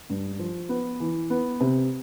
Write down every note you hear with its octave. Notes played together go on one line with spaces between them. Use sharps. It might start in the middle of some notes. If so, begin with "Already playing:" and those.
G2
F3
B3
E3
B3
C3